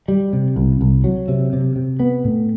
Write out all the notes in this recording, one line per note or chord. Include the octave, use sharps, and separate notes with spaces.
G3
C3
C2
C2
F#3
C3
C3
C3
B3
A2